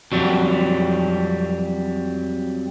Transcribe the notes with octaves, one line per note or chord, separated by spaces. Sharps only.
F2 F#3 G3